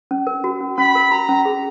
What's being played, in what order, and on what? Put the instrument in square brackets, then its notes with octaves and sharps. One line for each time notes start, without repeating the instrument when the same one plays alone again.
[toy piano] C#4
A#4
F#4
C#4
[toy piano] C#4 [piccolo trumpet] B5
[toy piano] A#4
[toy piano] F#4 [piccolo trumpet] A#5
[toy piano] C#4
G#4